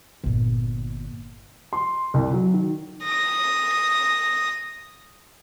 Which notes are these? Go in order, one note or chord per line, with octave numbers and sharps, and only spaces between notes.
G1 A#2
C6
C2
F#3
D#3
D#6 A#6